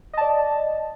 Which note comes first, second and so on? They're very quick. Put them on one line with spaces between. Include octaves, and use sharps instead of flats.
D#5 A5 D5